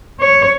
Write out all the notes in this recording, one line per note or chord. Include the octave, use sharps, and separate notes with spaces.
C#5